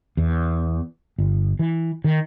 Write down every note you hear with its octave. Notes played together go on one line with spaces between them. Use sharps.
E2
G1
E3
D#3